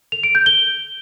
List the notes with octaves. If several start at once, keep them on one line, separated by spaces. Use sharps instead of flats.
F7
D7
G6
G7